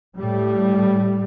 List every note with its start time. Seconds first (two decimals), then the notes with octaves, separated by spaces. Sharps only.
0.18 A2 G3